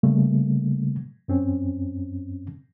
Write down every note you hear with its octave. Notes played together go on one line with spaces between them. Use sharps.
C#3 G3 A3 A#3
F#2 C4 C#4